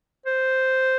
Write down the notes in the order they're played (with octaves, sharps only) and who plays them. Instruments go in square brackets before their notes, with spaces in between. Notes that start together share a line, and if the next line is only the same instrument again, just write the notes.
[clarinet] C5